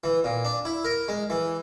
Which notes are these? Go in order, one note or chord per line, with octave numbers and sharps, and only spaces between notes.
E3
A#2
D4
E4
A#4
G#3
E3